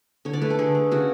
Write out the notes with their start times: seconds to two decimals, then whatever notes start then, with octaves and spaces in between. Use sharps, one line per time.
0.25 D3 C#5
0.33 D5
0.42 A3 B4
0.50 A4
0.59 D3 G#4
0.75 A3
0.91 C#3 F#4